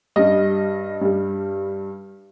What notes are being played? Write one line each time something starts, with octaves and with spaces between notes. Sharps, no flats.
G2 G3 D#5
G2 G3